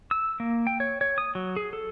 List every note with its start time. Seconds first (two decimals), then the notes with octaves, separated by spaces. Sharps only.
0.11 E6
0.40 A#3
0.67 G5
0.80 C#5
1.01 C#5
1.18 D#6
1.35 F#3
1.56 G#4
1.73 A4